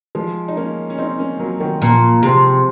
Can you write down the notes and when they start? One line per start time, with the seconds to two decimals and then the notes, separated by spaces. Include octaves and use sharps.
0.15 F3 G#3
0.48 D#4
0.57 A#3 C#4
0.90 C#4
0.98 C4 D#4
1.19 A#3 C#4
1.40 F#3 A#3
1.60 D#3 F#3
1.81 A#2 C#3 F3
2.23 C3 F3 G#3